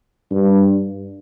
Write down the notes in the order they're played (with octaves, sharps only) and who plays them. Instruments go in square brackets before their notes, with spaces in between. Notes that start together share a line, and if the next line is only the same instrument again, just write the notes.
[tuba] G2